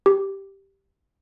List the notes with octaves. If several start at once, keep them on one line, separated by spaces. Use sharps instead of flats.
G4